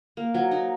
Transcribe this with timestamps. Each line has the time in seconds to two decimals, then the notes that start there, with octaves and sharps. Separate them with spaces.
0.17 A#3
0.34 F#3
0.51 D#4